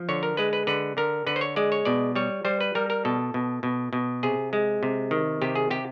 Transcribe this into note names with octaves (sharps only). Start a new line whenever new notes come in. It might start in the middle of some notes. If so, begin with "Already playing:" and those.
Already playing: F3
D3 C#5
A#4
G#3 B4
B4
D3 B4
D3 A#4
D3 B4
C5
C#5
G#3 D5
C#5
B2 D5
G3 C#5
G3 C5
B4
G3 A#4
A#4
B2 A4
B2
B2
B2
C3 G#4
G#3
C3
D#3
C3 G4
G#4
C3 G4